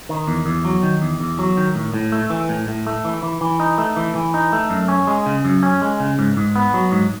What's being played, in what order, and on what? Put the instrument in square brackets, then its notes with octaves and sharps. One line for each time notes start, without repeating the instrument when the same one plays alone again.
[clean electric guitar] D#3
E2
E2
F#3
D#3
E2
E2
F#3
D#3
A2
A2
A3
E3
A2
A2
A3
E3
E3
E3
D#4
A3
E3
E3
D#4
A3
F#2
C#4
G#3
C#3
F#2
C#4
G#3
C#3
G#2
G#2
B3
F#3
G#2